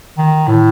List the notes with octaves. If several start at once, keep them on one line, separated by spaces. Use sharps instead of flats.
D#3
A2